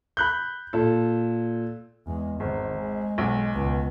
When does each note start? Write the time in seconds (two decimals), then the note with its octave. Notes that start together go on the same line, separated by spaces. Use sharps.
0.17 B5 F#6 G6
0.73 A#2 A4
2.07 E2 G#3
2.40 G#1 D#3
2.78 G#3
3.18 B1 G#2
3.54 C#2 B3